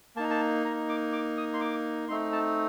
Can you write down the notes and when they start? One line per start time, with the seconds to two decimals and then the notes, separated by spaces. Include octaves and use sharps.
0.16 A#3 A5
0.19 D#4 A#5
0.31 A5
0.65 A#5
0.89 D6
1.13 D6
1.37 D#6
1.54 C6
1.61 D6
2.08 A3 C4 D#4 C6
2.32 A5